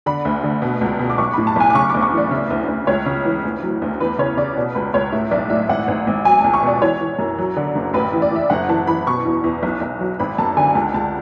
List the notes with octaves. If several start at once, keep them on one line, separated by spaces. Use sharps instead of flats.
D3 B5
D2
D3
B2
C#2
B2
D6
B1 C#6
A2 B5
A5
B1 G#5
D6
C#3 C#6
D2 D6
C#6
E3 D5
C#3 E5
D2
D2
C#2 C#5
C#3
E3
D2
F#3
D2
E2 B4
C#3 C#5
C#3 D5
B2
C#2 B4
C#2 C#5
A2 E5
B1 D5
A2 E5
G#1 F#5
G#1
G#1
F#3 G#5
C#2 A5
C#6
B2 D5
E3 C#5
E3
F#2
F#3
D3
F#1
A1 B4
E3
D5
E3 E5
F#1 F#5
E3 A5
E3 B5
B2 C#6
E2
E2
B1
B1
F#3
G#1 B5
F#2 A5
D3 G#5
C#2 A5
C#2 A5